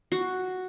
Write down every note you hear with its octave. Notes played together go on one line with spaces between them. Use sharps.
F#4